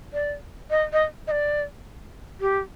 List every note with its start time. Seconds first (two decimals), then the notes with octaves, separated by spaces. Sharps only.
0.13 D5
0.70 D#5
0.93 D#5
1.27 D#5
1.31 D5
2.41 G4